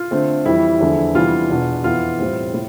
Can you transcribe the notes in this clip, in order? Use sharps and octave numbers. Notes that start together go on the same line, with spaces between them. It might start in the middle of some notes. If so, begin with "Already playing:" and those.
Already playing: F4
D3 A3 C4
F2 E3 G3 E4
E2 D3 F3 A3
C3 E3 G3 B3 D4 F4
E2 B2 B3 D4
F2 E3 B3 F4
A2 G3 C4
A2